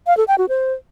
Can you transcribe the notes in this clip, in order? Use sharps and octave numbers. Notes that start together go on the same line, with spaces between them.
F5
A4
G5
F#4
C5